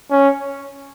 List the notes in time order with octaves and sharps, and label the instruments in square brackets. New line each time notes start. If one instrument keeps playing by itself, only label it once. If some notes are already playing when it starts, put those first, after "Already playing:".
[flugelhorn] C#4